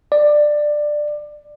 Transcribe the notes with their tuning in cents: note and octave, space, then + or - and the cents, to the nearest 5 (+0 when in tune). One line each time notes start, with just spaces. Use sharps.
D5 +15